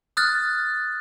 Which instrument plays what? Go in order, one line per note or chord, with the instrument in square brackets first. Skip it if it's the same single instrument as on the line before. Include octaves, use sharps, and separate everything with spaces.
[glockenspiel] D#6 F6 F#6 A6